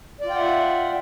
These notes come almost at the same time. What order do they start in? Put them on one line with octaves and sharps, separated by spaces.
D5 F4 G5 F#5 E5